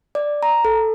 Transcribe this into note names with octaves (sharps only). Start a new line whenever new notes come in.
D5
A#5
A4